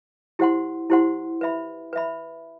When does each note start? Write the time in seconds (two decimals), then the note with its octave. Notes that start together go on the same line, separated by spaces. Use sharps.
0.39 E4 G4 C5 F#5 C6
0.90 E4 G4 C5 F#5 C6
1.41 B4 E5 B5
1.93 B4 E5 B5